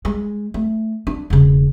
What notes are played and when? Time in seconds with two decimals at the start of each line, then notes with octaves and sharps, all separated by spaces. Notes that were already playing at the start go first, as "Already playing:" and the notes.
0.05 G#3
0.54 A3
1.07 D4
1.30 E1 C#3